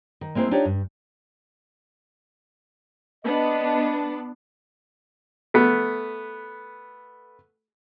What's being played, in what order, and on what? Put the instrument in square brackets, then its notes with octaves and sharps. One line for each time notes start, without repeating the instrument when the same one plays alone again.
[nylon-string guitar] D#3
G#3 A#3 C4 E4 C5
D4 D#4 F4 G4 C#5 D5
G2
[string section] B3 D4 [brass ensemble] D#5
[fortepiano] A3 B3